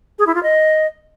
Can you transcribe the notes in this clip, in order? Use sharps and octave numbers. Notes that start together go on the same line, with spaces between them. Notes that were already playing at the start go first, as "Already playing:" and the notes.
G#4
E4
F4
D#5